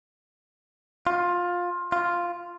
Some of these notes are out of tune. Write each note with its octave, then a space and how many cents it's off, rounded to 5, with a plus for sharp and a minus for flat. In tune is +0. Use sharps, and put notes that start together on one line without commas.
F4 +15
F4 +0